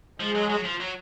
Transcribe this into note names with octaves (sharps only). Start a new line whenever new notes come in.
F3 G#3
F#3
F#3
F3
F#3